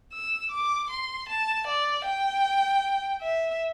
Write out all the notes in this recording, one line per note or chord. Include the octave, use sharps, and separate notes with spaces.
E6
D6
C6
A5
D5
G5
E5